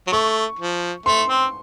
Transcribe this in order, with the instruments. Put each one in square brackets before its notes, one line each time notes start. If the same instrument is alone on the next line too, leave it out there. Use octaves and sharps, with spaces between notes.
[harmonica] F#3
[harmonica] A3 [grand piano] C#6
[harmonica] F3
[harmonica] A3 [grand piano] C6
[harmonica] C4